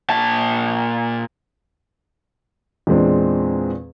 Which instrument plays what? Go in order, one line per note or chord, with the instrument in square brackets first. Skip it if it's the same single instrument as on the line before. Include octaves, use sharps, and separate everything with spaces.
[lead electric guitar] A#2 A5
[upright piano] E2 A#2 G#3 C4 D4